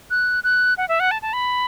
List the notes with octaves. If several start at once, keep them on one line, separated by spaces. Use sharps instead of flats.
F#6
F#6
F#5
E5
F#5
A5
A5
B5